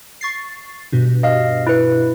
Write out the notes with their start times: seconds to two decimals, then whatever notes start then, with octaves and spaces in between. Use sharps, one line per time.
0.21 C#6 A6 C7
0.93 G2 B2
1.23 D#5 F5
1.67 E4 B4